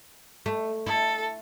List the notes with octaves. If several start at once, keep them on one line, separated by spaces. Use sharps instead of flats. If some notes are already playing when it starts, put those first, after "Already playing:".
A3
E4 A4